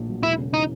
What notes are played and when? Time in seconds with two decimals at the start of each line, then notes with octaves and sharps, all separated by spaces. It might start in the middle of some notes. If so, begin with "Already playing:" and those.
Already playing: A#1 A2
0.09 F#3
0.23 E1 E4
0.38 C#3
0.54 E3 D#4